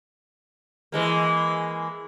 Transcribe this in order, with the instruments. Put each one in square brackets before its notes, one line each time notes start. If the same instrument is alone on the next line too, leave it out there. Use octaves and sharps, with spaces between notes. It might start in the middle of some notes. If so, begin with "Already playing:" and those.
[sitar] E3 G#3 A#3